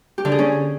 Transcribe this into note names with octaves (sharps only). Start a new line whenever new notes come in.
G4
D3
G#4
C#4